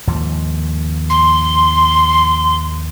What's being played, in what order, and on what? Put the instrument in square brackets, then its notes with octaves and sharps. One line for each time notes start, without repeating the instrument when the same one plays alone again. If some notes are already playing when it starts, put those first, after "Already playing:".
[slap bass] D#2 G#2 F3
[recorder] C6